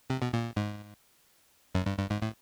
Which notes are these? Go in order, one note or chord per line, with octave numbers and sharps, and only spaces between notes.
C3
B2
A#2
G#2
F#2
G2
G2
G#2
A2